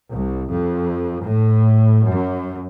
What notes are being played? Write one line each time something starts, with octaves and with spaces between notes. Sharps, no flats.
C2
F2
A2
F#2